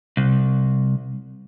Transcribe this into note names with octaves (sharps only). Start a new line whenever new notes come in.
C2